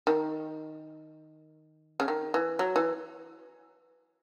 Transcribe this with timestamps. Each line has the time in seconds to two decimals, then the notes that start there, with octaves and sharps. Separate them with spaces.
0.07 D#3
2.00 C#3
2.08 D#3
2.34 E3
2.59 F#3
2.76 E3